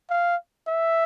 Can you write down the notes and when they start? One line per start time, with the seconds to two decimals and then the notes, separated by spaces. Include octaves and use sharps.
0.10 F5
0.68 E5